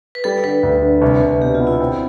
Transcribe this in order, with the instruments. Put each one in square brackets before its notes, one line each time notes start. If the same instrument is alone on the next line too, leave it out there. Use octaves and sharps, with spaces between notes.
[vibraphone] B4
[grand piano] G3 [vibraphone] A4
[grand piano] D3 [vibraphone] B4
[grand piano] D2
D3
C2
C2
[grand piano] B2 [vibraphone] G4
[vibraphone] F4
[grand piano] B3
[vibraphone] E4
[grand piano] C4